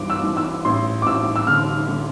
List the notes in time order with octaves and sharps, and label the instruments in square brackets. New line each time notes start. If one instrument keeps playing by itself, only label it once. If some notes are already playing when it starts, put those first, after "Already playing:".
Already playing: [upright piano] G2 E3 D6
E6
E3
E6
A1 C6
D6
A1 E6
E6
D3 F6
D3